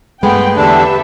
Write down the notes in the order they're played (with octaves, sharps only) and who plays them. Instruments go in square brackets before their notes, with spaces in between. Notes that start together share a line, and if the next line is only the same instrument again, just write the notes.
[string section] G2 G5 [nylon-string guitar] G#3 A3 [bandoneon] B3 [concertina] B4
[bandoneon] E2 D3 D4 [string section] G4 A4 E5